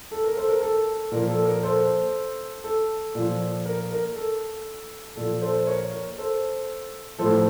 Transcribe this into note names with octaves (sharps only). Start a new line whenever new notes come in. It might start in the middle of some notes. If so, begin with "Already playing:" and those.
A4
A#4
A4 C5
A#4
A4
A#2 F3 A#4
A4
A#4
A4 C5
A4
A#2 F3
A#4
A#4
A4
A#2 F3 A4
A4 C5
A#4 C#5
A#4
A4 C5
A2 F3 A4 C5